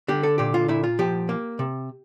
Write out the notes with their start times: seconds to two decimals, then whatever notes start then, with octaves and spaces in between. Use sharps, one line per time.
0.08 D3 G4
0.23 A4
0.38 A#2 G4
0.54 F4
0.68 A#2 E4
0.84 F4
0.99 F3 G4
1.29 A#3
1.59 C3